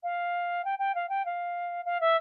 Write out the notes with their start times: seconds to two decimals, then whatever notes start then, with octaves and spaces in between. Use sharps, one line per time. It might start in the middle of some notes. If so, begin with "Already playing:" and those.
0.03 F5
0.65 G5
0.79 G5
0.95 F5
1.09 G5
1.25 F5
1.85 F5
2.01 E5